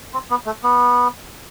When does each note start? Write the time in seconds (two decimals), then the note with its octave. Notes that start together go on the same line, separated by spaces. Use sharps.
0.14 C4
0.30 B3
0.46 A3
0.63 B3